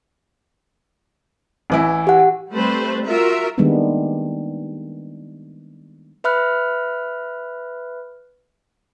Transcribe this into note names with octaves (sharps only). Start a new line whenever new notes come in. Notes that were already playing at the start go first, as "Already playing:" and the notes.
A1 E3 E4
G4 F#5
G3 A3 C4 B4 C5
F4 F#4 A#4 E5
D#3 G3 G#3 A#3 B3 D4
B4 E5 B5 F6 F#6